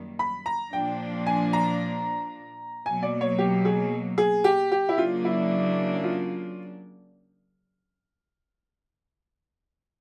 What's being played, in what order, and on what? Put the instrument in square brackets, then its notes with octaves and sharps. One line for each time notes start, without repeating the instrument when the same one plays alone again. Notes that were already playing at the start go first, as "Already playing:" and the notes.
Already playing: [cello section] F#2 D#3 G3 A#3
[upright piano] B5
A#5
[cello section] A#2 F3 A#3 D4 [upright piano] G5
[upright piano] G#5
A#5
[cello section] B2 F#3 A#3 [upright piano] G#5
[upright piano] D5
C#5
G4
G#4
G#4
G4
G4
E4
[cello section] C#3 F#3 A#3 D4 [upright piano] F4
[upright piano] E4
F4